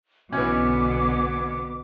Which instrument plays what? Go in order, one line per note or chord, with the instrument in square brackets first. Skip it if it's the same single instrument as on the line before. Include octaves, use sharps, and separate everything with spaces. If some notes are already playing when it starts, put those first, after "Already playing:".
[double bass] B1 D3 [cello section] B2 B3 [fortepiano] E3 C#4 [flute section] D6